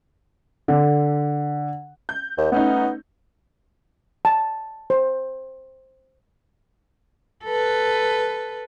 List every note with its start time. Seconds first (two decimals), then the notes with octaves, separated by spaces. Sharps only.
0.68 D3
2.09 G6
2.38 D#2
2.52 A3 B3 C#4 D#4
4.25 A5
4.90 C5
7.44 A4 B4